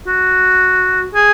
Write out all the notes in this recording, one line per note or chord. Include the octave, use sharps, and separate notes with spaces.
F#4
G#4